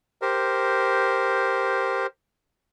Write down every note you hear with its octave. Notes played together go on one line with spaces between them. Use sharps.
G4 A#4 C5